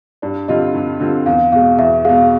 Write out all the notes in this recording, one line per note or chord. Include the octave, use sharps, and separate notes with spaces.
G2 D5
D3 G3 C4 F4 D#5
G2
D3 G3 C4 F4
E2 F5
B2 G#3 F5
E2 E5
B2 G#3 F5